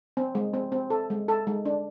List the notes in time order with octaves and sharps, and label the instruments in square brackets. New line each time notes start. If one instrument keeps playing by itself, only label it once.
[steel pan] C4
G#3
C4
C4
A4
G#3
A4
G#3
D4